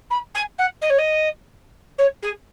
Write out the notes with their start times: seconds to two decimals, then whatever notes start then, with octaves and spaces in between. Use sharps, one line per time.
0.10 B5
0.34 G#5
0.58 F#5
0.81 D#5
0.89 C#5
0.98 D#5
1.98 C#5
2.22 G#4